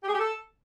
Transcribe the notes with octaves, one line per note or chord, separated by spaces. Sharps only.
G4
G#4
G4
A4